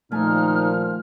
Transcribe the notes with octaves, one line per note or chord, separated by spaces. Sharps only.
A#2 D#3 F3 A3 D#4 G#5 F6